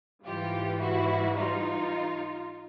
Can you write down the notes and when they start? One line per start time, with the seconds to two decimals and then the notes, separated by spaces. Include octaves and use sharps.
0.24 G#2 E3 G3 F4 G4
0.80 E4 F#4
1.36 D#4 F4